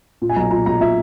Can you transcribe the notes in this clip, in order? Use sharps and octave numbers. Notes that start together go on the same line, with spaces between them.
A#2
G#5
B1 A#5
A#2 A#5
B1 A#5
A#2 E5